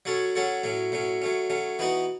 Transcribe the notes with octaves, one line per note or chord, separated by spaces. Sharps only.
F#3 C#4 F#4 A4 C#5
F#3 C#4 F#4 A4 C#5
A2 F#3 C#4
A2 F#3 C#4
F#3 A3 C#4
F#3 A3 C#4
E3 B3 D#4 F#4 B4